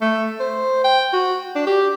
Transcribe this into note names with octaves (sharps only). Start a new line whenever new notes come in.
A3
C5
G5
F#4
D4
G4